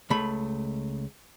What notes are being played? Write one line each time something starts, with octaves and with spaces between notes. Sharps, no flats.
C#2 A3 B5